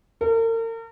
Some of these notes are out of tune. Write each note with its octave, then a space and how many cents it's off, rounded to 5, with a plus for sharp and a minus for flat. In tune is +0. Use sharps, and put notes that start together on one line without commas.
A#4 -40